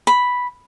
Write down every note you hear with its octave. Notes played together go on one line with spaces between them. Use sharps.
B5